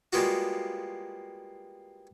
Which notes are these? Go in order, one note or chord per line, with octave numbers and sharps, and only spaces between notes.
G3 G#3 A#3 B3 F4 F#4